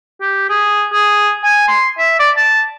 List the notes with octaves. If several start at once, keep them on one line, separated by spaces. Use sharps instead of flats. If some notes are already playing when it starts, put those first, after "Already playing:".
G4
G#4
G#4
G#5
C6
E5
D5
A5